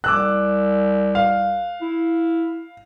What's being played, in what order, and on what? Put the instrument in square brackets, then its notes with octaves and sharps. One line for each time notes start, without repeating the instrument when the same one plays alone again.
[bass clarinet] C2 [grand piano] D6 E6 F#6
[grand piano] F5
[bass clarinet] E4